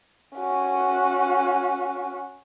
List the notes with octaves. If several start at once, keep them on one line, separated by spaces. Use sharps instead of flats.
C#4 F#4